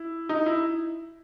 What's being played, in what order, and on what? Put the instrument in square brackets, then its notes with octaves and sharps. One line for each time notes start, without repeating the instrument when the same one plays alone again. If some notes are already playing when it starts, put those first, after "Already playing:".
Already playing: [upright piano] E4
D#4
E4